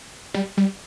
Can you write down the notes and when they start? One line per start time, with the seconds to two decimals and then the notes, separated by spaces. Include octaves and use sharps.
0.34 G3
0.57 G3